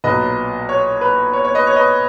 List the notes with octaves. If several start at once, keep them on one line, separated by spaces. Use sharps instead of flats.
B1 A#2 F#3 B4 D#5
C#5
B4
C#5
C#5
B4 D#5
C#5
B4 D#5